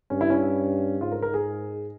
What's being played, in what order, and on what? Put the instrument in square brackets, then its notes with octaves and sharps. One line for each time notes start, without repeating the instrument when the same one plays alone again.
[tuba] G2 [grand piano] C#4
[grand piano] E4
C#4
[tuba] G#2 [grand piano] F4
[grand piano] A#4
A#4
G#4